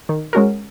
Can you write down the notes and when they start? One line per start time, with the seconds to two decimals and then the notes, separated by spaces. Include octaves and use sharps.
0.09 D#3
0.33 G#3 C#4 F#4 A#4